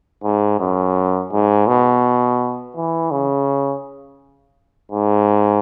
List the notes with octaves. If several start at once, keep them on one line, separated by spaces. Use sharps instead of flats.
G#2
F#2
G#2
B2
E3
C#3
G#2